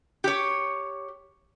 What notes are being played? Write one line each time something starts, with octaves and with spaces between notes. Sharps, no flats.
G4 C#5